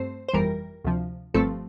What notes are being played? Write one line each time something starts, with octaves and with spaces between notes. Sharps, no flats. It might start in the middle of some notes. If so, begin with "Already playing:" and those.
Already playing: G2 A3 C4 C5
C5
G1 F2 E3 G3 A#4
D2 C3 F3
G1 G2 F3 A3 C4 A4